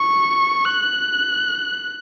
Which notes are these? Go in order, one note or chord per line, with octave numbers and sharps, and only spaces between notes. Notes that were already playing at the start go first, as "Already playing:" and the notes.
Already playing: C#6
F#6